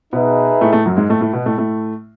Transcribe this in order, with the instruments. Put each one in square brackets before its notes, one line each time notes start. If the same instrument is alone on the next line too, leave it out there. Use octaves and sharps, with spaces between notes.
[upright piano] B2 B3 [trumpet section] D#4 G#4 B4 E5
[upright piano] A2 A3
A2 A3
F#2 F#3
G#2 G#3
A2 A3
A2 A3
B2 B3
A2 A3
A2 A3